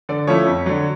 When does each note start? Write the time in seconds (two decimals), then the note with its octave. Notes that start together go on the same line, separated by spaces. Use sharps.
0.09 D3 D5
0.27 F3 A3 C#4 E4 C#5
0.47 F2
0.66 D3 F#3